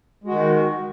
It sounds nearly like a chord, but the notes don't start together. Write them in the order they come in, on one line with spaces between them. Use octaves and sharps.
G#3 F#4 D#3